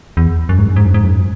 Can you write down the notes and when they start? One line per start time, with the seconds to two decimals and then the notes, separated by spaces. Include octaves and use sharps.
0.17 E2
0.49 F#2
0.59 G#2
0.68 F#2
0.76 G#2
0.85 F#2
0.94 G#2
1.04 F#2